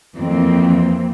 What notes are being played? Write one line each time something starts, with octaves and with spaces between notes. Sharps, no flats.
F2 E3 A#3 C4